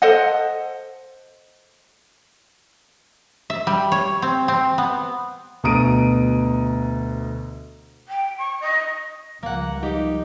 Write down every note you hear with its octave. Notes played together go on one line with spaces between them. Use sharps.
A4 C5 D#5 F#5
E5
G3
C#5
C4
C4
B3
D2 B2 A#5 D#6 D7 D#7
G5
C#6
D#5
C#2 F3 G3 A#3 F#5
D#4 G4